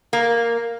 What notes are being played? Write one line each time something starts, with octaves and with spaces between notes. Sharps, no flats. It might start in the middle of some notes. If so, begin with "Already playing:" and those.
A#3